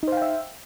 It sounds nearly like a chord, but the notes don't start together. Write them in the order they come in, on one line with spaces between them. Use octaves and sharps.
D#4 C5 F5 G5 E5